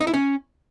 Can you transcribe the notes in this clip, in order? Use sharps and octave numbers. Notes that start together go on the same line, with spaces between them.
D#4
E4
C#4